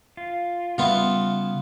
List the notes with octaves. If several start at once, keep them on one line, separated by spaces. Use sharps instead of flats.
F4
C#3 G3 B3 F4 E5